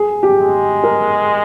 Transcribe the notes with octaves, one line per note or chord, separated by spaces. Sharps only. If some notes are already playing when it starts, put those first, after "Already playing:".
Already playing: G#4
G4
G#3
A#4